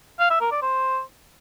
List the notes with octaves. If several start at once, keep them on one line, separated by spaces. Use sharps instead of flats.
F5
E5
A#4
D5
C5